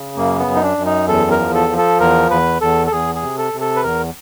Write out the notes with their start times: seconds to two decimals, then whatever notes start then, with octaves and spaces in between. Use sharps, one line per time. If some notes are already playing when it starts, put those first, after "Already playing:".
Already playing: C#3
0.16 F#2 A#3
0.39 B3
0.47 F#2
0.55 D#4
0.62 D4
0.78 F#2
0.85 D#4
1.08 E2 A4
1.31 A#4
1.39 F3
1.54 A4
1.69 F3
1.78 A4
2.00 E2 A#4
2.30 E2 B4
2.61 E2 A4
2.87 A4
2.92 E2 G#4
3.15 G#4
3.22 C3
3.38 A4
3.53 C3
3.61 A4
3.76 B4
3.83 E2 A#4